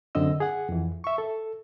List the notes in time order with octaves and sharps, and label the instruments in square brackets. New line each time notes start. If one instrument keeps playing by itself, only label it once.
[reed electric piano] F#2 D3 C4 D#5 E6
G#4 F#5
F2 E3
E5 C#6
A4